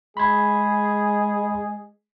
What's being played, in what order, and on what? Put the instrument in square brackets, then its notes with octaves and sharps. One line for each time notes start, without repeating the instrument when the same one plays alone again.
[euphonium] G#3 [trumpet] G#4 [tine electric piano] B5 C6 G#6